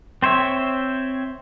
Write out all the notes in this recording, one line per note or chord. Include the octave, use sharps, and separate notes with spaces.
C4 C5 C#5 E5